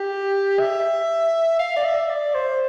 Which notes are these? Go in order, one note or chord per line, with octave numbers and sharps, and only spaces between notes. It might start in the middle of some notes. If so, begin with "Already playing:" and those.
Already playing: G4
E5
F5
D5
E5
D5
C5